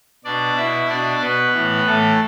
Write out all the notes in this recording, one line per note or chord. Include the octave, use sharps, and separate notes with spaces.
B2 D4 D5
B2 E4 E5
B2 D4 D5
B2 B3 B4
A2 E3
A2 E3 A3 A4